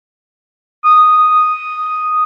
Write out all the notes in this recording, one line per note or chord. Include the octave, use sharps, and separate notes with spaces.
D#6